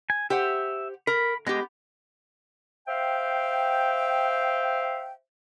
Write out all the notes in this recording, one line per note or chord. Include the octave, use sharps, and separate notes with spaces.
G#5
G4 C5 E5 F#5
A#4 B5
G#3 B3 G4 D#5
C5 E5 F5 G5